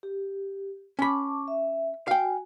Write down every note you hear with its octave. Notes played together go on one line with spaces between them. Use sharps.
G4
C#4 A5 B5 C#6 D6
E5
F#4 F5 G5 G#5